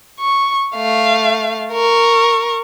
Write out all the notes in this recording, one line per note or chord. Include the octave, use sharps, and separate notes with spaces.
C#6
A3 F5
A#4 C#6